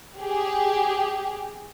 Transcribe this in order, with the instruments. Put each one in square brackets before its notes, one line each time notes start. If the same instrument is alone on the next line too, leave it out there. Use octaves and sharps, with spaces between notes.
[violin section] G4 G#4